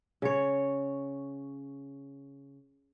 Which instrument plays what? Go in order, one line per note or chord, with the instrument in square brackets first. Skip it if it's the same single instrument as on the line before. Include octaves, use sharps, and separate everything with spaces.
[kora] C#3 C#5